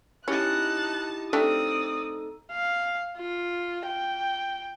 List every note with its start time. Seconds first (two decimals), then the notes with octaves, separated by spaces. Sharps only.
0.28 C#4 D#4 E4 G4 A5 F#6 A6
1.33 A3 C4 D4 D#4 G4 A4 D5 D#6
2.52 F5
3.18 F4
3.86 G5